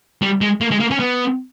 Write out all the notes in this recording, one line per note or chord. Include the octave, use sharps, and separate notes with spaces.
G3
G#3
A#3
G#3
A#3
C#4
B3